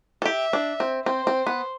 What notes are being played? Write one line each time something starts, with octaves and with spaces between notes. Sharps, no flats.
A4
G4 E5
D4
C4
C4 C5
C4
B3